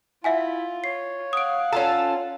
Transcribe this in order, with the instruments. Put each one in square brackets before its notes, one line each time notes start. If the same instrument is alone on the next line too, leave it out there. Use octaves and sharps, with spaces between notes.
[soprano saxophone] E4 [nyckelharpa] F4 [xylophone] E5 F#5 G#5
[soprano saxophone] C#5 [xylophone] C7
[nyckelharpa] F5 F#5 [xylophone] D#6 D7
[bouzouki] C#4 F4 A4 [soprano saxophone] A5 [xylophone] A#5